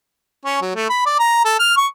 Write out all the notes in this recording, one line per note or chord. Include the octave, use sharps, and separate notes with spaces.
C#4
F#3
A3
B5
D5
A#5
A4
F6
C#6